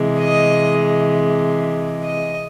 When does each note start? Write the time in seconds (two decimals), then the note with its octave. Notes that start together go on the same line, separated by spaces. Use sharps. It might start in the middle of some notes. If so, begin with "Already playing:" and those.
Already playing: C3 E3 G#3
0.19 D#5
2.04 D#5